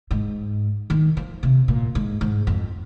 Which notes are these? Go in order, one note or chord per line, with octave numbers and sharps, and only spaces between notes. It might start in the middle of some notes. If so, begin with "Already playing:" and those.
G#2
D#3
F3
C3
A#2
G#2
G#2
F2